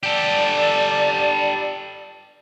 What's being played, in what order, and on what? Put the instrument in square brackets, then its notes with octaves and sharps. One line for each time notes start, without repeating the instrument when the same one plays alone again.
[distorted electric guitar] G4 A4 [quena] D5